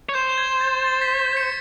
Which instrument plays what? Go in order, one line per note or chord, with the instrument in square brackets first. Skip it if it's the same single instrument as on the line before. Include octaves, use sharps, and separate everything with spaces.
[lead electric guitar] C#5
[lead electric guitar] C5 [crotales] G6
[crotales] G6
G#6
A6
A6
B6
B6
C#7